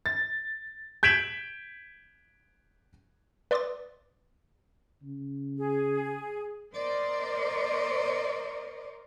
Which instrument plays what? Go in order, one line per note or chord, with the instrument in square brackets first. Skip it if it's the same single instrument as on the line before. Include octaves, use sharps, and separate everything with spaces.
[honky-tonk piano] A6
[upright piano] G6 G#6 B6 D7 E7 F#7
[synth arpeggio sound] B4 D5 C6 D6 D#6 A6
[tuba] C#3
[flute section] G#4
[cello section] A#4 C5 D5 D#5